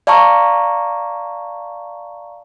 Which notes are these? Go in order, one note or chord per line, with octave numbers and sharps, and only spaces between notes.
D5 F5 A5 A#5 C#6